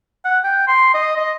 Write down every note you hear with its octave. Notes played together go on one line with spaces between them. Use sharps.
F#5
G5
C6
D#5
D#5